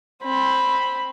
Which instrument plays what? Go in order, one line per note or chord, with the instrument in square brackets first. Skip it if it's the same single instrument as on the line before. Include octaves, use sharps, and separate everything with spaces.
[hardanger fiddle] C4 [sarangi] B5